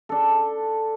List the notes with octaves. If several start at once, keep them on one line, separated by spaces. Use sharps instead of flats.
D4 A4